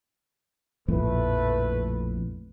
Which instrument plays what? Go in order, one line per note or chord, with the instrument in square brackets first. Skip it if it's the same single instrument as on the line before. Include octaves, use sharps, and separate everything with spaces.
[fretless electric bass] A#1 F2 A2 [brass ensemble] A3 B4